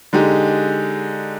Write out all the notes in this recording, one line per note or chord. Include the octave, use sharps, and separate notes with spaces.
D3 G#3 D#4 G4